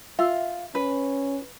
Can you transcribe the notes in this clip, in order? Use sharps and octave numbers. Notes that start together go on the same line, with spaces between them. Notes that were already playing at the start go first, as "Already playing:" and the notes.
F4 E5
C#4 B4